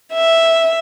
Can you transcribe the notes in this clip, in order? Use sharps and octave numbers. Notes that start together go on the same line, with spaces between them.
E5